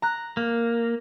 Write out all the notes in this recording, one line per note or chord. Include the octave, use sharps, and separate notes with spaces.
A#5 F#6
A#3